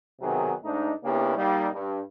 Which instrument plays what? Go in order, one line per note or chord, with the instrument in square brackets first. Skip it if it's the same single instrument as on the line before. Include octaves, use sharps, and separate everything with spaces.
[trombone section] B1 C3 D#3 F#3 B3 G#4
G#2 A3 D4 D#4
C#3 A#3 B3 D4 E4 G4
G3 A#3 D#4
G2